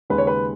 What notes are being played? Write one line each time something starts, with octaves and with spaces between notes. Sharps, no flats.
D#2 C#3 G#3 B4
C#5
B4